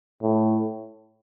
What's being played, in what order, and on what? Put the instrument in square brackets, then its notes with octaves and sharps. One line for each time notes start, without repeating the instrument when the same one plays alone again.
[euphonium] A2